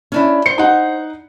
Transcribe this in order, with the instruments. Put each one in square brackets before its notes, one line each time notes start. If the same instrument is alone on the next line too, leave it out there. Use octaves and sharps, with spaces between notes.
[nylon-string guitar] C#4 D4 E4
[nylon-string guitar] C5 [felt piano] C7 C#7
[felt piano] D#4 F#5